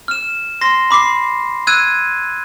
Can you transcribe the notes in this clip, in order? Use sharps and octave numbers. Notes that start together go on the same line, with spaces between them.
F6 E7
C6 A#6 C7
B5 D6 B6 C7
E6 F#6 G#6 D#7